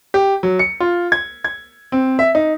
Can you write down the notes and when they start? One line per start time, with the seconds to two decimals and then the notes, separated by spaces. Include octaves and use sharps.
0.14 G4
0.43 F#3
0.59 C#7
0.80 F4
1.12 G#6
1.44 G#6
1.92 C4
2.19 E5
2.35 D#4